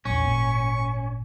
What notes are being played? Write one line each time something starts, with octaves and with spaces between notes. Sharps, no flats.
A#1 E2 C#4 C#6
G#1 A#2